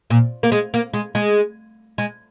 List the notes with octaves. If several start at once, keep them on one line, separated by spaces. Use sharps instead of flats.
A#2
A#3
G#3
A#3
G#3
G#3
G#3